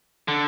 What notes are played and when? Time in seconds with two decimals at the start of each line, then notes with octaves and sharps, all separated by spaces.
0.28 D3